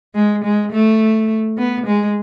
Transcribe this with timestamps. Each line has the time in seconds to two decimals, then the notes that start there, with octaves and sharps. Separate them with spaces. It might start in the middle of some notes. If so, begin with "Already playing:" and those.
0.15 G#3
0.44 G#3
0.72 A3
1.58 B3
1.86 G#3